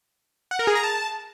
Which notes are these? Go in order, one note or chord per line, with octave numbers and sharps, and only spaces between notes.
F#5
A#4
G#4
A#5
A5